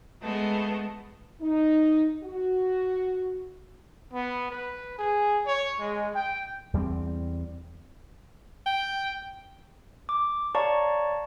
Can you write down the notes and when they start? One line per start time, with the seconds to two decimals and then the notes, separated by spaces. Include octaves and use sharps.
0.22 G#3 A3 B3
1.41 D#4
2.23 F#4
4.14 B3
4.51 B4
4.97 G#4
5.47 C#5
5.80 G#3
6.13 G5
6.73 E2 G3 G#3 C4
8.66 G5
10.09 D6
10.55 C#5 D5 F5 A5 A#5 C#6